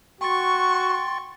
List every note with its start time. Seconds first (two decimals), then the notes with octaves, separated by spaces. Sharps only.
0.21 F#4 G5 C6 C#6 A6